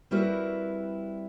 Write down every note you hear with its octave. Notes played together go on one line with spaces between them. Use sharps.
G3 C4 E4 F#4 A#4 B4